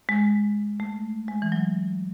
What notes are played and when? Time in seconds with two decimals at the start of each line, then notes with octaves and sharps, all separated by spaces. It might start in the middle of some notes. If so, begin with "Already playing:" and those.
0.09 G#3
0.80 A3
1.28 G#3
1.42 E3
1.52 F#3